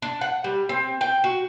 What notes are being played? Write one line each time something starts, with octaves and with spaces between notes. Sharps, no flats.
D4
F#5
G3
C4
G5
F#4